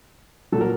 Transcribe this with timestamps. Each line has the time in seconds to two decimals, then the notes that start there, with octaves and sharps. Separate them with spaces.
0.52 A#2 F#3 A4
0.61 A#4